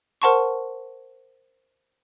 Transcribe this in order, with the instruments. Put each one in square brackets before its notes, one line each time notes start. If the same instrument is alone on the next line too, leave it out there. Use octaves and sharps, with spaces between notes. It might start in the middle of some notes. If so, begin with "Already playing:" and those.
[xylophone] A#4 C5 F#5 A5 C6 C#6